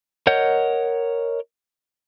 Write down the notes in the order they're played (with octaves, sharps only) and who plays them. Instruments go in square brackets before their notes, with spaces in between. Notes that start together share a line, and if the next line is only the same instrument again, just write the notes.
[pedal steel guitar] A#4 C#5 D#5 F#5 G6